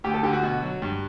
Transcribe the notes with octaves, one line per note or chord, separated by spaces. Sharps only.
D2 G4
A4
D3 G4
F#4
B2
F#3
G2